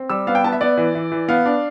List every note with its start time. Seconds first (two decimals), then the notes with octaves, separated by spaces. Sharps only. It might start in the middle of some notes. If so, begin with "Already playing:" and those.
Already playing: C4
0.09 G3 E6
0.27 B3 F5
0.35 G5
0.44 B3 A5
0.52 E5
0.61 B3 D5
0.77 E3
0.95 E3
1.12 E3
1.28 B3 F5
1.46 D4